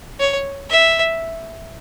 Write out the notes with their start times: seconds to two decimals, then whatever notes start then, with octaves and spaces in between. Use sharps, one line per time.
0.20 C#5
0.70 E5